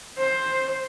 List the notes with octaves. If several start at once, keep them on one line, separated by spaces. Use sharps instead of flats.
C5